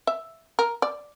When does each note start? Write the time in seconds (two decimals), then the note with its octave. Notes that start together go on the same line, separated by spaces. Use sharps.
0.07 E5
0.59 A#4
0.82 D5